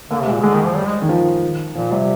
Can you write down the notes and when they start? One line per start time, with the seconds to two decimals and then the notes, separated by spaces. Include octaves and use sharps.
0.10 D3 A#3
0.21 C3
0.27 G#3
0.32 A#2
0.43 D3 G#3
0.54 D#3
0.65 F3
0.76 G3
0.87 G#3
1.02 D#3
1.09 F3
1.75 A#2 F3
1.91 C3 G3